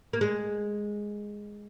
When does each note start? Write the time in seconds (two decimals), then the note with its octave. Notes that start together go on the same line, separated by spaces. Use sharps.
0.13 A#3
0.21 G#3